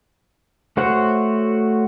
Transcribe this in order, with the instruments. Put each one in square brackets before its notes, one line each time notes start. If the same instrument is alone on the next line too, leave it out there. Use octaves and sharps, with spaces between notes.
[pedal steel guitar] A3 F#4 C5 C#5 F#5